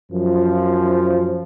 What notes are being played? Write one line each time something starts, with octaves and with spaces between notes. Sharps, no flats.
F#2 F3